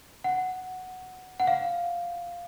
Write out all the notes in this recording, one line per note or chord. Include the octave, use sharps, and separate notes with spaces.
F#5
F#5
F5